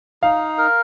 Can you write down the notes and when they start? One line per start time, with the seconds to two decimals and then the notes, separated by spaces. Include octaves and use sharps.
0.23 D#4 F5
0.58 A#4